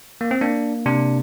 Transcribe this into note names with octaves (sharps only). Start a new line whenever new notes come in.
A#3
C4
A#3 D4
C3 D4